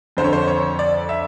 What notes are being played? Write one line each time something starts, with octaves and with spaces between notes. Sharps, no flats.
F2 D3 C5
C#5
C5
C#5
D5
E5